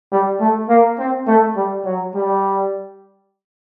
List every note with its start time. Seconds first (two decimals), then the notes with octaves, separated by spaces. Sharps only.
0.12 G3
0.40 A3
0.69 A#3
0.99 C4
1.27 A3
1.56 G3
1.85 F#3
2.15 G3